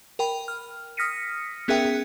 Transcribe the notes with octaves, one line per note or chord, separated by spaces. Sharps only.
A#4 G5 B5
F6
D#6 F6 A#6 B6 C#7 D#7
B3 C#4 G#4 A#4 E5 G5